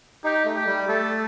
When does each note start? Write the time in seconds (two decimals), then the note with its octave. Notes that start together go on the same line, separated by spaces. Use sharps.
0.24 D#4 G4
0.45 A3
0.55 G4
0.66 G3
0.88 A3 A4